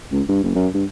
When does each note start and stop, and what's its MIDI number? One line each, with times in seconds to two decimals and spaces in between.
0.12 0.22 37
0.29 0.42 43
0.44 0.52 30
0.56 0.68 42
0.74 0.85 43